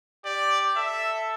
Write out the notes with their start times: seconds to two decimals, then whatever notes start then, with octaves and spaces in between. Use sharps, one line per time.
0.25 G4 D5
0.76 A4 E5